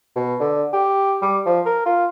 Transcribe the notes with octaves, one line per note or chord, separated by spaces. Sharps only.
B2
D3
G4
G3
F3
A#4
F4